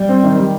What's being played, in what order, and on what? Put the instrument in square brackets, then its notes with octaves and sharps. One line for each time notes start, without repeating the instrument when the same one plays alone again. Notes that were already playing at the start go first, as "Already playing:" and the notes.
Already playing: [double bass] G3
[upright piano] C4
D#3
G3